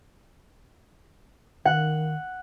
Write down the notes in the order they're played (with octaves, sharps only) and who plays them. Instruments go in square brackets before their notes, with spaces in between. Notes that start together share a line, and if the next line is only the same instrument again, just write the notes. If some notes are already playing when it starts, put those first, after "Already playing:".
[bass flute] D#3 [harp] F#5